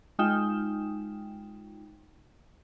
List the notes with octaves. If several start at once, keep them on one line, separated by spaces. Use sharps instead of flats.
G#3 D#4 F4 G5 E7